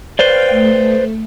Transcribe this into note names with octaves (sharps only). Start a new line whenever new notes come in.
B4 C5 D5 F5 G5
A3